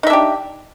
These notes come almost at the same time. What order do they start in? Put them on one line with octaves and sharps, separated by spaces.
D#4 E5 D4 G4